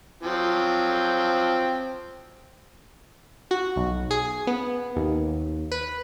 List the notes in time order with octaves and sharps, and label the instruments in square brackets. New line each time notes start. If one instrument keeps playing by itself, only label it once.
[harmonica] F3 F#3 C4
[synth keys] F#4
B1
G#4
B3
D#2
B4